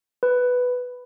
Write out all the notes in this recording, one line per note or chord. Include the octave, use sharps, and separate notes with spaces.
B4